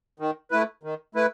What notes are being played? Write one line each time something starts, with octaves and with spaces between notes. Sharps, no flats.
D#3
A3 E4 B4
D#3
A3 E4 B4